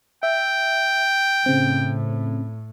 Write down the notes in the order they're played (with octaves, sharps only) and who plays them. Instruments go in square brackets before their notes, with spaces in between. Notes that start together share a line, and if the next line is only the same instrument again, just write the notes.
[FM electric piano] E5 [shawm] G5
[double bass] A2 [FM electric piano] C#3 C4